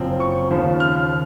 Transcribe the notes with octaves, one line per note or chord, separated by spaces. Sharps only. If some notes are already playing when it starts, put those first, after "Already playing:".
Already playing: F#1 F#2 F3 C4
C#6
D#2 C#3 F3
F6